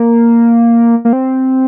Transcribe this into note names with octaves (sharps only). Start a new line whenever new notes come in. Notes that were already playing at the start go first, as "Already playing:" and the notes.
Already playing: A#3
A#3
C4